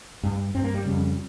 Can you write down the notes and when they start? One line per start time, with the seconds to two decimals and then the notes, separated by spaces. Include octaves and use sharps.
0.23 G2
0.55 G2 C4
0.64 A#3
0.74 G3
0.85 F2 C#3